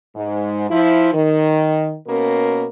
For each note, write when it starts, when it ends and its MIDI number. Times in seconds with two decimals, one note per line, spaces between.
0.15 0.69 44
0.70 1.11 53
0.70 1.11 64
1.13 1.93 51
2.08 2.65 47
2.08 2.65 58
2.08 2.65 61
2.08 2.65 70